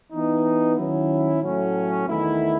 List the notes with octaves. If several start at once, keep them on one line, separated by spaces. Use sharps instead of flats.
E3 B3 D#4
D#3 F#3 C#4 E4
A2 F#3 A3 C#4
E2 D#3 A3 E4